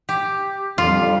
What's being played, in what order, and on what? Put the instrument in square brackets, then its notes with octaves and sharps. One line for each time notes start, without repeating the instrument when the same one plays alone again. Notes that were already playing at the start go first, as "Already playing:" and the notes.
[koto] G4
[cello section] F2 D3 G3 [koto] F4